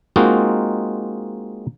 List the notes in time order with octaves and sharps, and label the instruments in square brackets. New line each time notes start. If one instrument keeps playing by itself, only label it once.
[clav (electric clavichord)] G#3 A#3 C4 D#4 F4 F#4